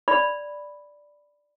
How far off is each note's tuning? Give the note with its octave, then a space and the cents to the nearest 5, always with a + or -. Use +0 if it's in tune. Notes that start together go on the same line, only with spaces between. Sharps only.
D5 +0 B5 +0